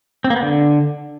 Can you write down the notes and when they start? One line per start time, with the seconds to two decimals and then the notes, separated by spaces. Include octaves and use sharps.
0.24 C4
0.30 A#3
0.36 B3
0.42 D3